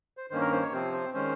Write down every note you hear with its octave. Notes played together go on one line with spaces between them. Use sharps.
C5
G2 D#3 A#3 C#4 C5
A#4
C5
C#5
C3 F3 C4 C5
C5
D#3 G#3 C#4 C5